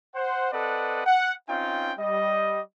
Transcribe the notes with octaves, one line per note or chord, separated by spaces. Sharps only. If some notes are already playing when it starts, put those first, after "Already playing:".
C5 F#5
C4 A4 B4 D5 D#5 F#5
F#5
C4 C#4 D#4 F4 F5 G5
G3 D#5